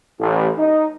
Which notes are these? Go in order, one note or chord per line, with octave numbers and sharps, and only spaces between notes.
A1
D#4